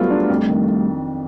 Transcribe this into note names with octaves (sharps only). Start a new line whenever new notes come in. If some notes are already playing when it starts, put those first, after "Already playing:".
Already playing: F#3 G3 A3 B3 F4
D4
F2
D#3